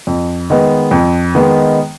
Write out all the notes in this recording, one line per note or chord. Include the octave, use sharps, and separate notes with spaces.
F2
D#3 G#3 B3
F2
D#3 G#3 B3